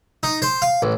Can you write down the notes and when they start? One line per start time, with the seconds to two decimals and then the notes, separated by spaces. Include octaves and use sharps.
0.23 D#4
0.42 C5
0.62 F5
0.82 A1